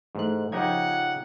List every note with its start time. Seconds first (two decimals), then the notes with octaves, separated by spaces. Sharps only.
0.15 G#2 E3 A3 F#6
0.52 C#3 F3 D#4 G4 F#5 G#6